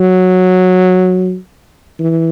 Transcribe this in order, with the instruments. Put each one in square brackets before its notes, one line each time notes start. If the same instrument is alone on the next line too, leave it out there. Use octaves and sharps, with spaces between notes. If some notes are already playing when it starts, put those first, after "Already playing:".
Already playing: [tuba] F#3
E3